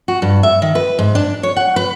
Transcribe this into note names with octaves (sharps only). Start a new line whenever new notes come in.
F#4
G2
E5
D#3
B4
G#2
D4
C#5
F#5
B4